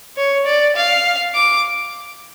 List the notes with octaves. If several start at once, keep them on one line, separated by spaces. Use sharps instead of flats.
C#5
D5
F5
D6